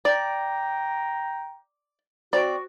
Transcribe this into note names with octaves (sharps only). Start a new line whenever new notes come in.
D5 G5 A#5
C4 F#4 D5